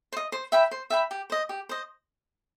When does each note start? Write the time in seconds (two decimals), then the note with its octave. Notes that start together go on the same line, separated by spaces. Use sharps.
0.13 C5
0.17 D#5
0.32 C5
0.52 E5 G5 B5
0.71 C5
0.90 E5 G5 B5
1.11 G4
1.30 C5 D#5
1.49 G4
1.69 C5 D#5